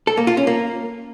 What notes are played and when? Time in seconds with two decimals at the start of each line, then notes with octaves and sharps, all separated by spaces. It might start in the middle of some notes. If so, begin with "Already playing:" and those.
0.07 A4
0.17 A#3
0.27 F4
0.37 C#4
0.47 A#3